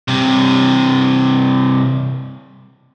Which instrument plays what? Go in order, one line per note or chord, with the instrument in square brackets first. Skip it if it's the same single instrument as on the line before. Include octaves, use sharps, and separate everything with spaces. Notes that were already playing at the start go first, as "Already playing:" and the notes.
[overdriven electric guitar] G2 C3